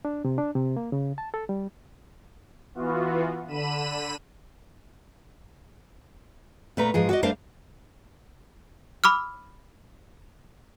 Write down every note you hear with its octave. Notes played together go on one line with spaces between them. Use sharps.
D4
C3
D4
C3
A#3
C#3
A5
A4
G3
E3 B3 F4 F#4
D3 B5 D#7 E7
A#2 A3 B4 A#5
G#2 F3 G#4
F#4 D5 D#5
G3 A3 D4 A#4 C5 F5
B5 D6 E6 F6